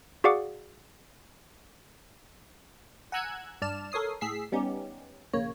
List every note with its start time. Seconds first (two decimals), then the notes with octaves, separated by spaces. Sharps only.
0.24 F#4 G#4 D5 F5 F#5 D6
3.12 F#5 G#5 A#5 E6 F#6 G#6
3.62 G2 D5 A5 F6 E7
3.92 A4 A#4 C#5 D#6 C7
4.21 A2 G#4 E6 B6 C7
4.52 G3 B3 C#4 D#4 G4
5.33 A#1 C#3 A#3 C#5